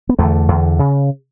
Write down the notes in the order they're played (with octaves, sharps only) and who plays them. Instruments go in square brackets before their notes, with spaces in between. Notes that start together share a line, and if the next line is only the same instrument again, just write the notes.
[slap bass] B3
E2 D3 A3
E2 D3
C#3